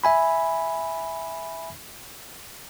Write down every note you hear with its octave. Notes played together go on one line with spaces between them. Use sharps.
E5 G#5 B5